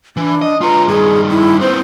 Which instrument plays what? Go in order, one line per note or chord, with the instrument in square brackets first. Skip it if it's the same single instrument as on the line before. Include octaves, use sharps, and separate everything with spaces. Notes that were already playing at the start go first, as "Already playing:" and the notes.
[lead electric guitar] E3 [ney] D4
[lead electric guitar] D#5
[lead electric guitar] F4 B4 [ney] A#5
[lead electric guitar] G2 D#3 [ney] G#4
[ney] E4
[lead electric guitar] B3 C4 [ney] C5